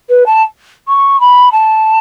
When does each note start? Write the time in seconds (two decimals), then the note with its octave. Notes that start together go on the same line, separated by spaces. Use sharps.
0.09 B4
0.26 A5
0.88 C#6
1.20 B5
1.52 A5